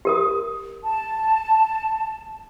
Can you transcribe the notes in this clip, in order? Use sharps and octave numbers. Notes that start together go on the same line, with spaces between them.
G4 A#4 D#6
A5